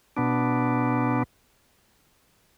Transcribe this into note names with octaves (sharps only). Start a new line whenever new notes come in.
B2 B3 D4